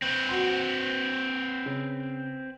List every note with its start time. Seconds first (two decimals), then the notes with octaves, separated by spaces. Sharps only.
0.02 C4 B4
0.29 F#4 F#5 C6
1.66 C#3